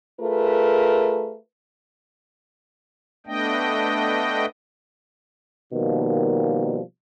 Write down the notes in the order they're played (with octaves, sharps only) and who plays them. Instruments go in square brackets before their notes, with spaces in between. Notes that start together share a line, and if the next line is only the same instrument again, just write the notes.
[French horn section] A3 F4 G#4 A#4 B4
[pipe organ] A3 B3 D4 D#5 G5
[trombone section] B2 D#3 F3 G3 A#3